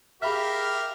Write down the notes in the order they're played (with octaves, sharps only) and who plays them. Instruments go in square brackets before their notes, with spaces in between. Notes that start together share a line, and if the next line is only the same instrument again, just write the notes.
[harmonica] G4 A#4 F5 [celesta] G#4 B5 F6 [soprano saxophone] E5